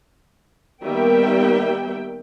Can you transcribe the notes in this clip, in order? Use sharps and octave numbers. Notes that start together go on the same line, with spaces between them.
D#3 G3 A#3 B3 E5 G5